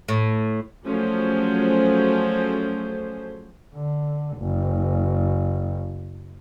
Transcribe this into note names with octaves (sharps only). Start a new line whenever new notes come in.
A2
F3 F#3 A3 C#4 G#4 C5
D3
F#1